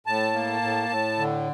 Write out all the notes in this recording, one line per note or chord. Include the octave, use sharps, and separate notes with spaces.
A2 A5
A#3
A2
A2
D3